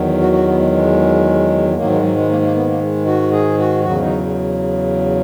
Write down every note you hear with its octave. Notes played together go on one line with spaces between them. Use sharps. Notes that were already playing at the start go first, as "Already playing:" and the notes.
Already playing: E2 D#3 F#3
F#4
F#4
B3
G#3
G#3
G#2 D#3 F#3 A#3
G#3
F#3
G#3
A#3
A#3
B3
A#3
G#3
F#4
G#4
F#4
E2 C#3 F#3 F#4
D#4